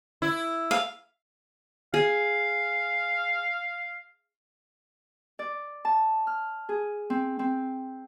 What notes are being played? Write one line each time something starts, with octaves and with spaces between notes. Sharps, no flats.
E4
F5
G#4 F5
D5
A5
F6
G#4
C4
C4